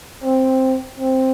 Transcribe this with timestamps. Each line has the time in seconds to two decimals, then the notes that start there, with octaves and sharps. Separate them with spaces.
0.23 C4
0.98 C4